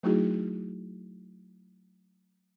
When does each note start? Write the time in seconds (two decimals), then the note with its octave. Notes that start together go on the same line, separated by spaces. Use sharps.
0.03 F#3 A3 D#4 E4 F#4 G#4